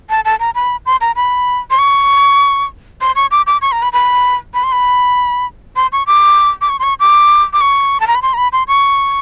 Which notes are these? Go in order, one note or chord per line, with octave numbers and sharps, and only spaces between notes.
A5
A5
A#5
B5
C6
A#5
B5
C6
C#6
C6
C#6
D6
D6
C#6
A#5
B5
B5
B5
C6
B5
C6
C#6
D6
D6
C#6
C6
C#6
D6
D6
C#6
A5
A#5
B5
C6
A#5
B5
C6
C#6